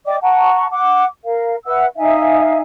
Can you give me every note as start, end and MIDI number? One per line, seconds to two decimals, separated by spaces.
0.06 0.17 74
0.06 0.17 75
0.06 0.17 79
0.06 0.17 86
0.22 0.66 78
0.22 0.66 81
0.22 0.66 82
0.22 0.66 85
0.71 1.06 78
0.71 1.06 86
1.24 1.57 70
1.24 1.57 77
1.66 1.86 71
1.66 1.86 76
1.66 1.86 78
1.66 1.86 88
1.96 2.61 63
1.96 2.61 76
1.96 2.61 77
1.96 2.61 80